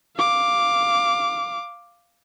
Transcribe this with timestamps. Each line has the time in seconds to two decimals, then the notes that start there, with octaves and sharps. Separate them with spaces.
0.16 F5 D6